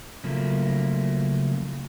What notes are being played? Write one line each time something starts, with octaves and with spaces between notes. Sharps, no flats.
C#3 F3 F#3 A3 A#3